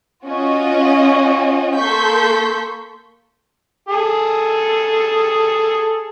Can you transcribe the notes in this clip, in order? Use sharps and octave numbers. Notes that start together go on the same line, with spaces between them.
C#4 F4 F#4 D#5
A#3 A4 C6 C#6 G6 B6
G#4 A4